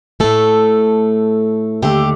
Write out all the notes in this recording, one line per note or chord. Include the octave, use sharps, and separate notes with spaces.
A2 A3 A4
D#2 D3 A3 G4